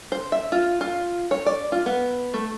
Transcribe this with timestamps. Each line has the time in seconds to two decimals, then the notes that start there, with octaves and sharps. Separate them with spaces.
0.12 C5
0.32 E5
0.52 F4
0.81 F4
1.31 C#5
1.46 D5
1.72 F4
1.86 B3
2.34 A3